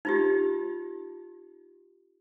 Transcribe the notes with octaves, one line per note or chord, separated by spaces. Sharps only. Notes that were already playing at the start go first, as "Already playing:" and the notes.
D#4 F4 G4